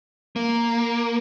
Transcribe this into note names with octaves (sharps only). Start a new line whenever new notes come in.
A#3